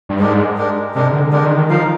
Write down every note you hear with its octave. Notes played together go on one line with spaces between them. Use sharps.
G2
G#2 G#3 D4 G4 A#4
G#3 D4 G4 A#4
C3 G#3 D4 G4 A#4
D3
D3 G#3 D4 G4 A#4
D#3
D#3
F3 D#4 A#4 F5